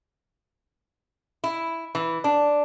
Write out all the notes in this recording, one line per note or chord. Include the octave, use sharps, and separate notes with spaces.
E4
E3
D4